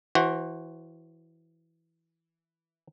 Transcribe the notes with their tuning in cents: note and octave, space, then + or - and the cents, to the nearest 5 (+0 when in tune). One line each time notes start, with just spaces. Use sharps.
E3 +0 F#4 +10 C5 +30